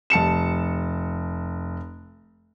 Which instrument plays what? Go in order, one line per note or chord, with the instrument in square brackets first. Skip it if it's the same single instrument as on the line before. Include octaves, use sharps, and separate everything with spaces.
[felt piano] F1 A5 C#7 E7